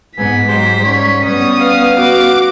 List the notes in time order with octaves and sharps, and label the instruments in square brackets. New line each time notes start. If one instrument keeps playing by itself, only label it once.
[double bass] G#2 [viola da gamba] B3 [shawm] G#5 [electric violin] B6
[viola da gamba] F#3 G#3 G4 [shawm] C5
[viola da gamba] G3 C#4 [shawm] C#5
[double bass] B3 [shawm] C#5 [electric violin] D#6
[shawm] F5
[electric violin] F#4 D6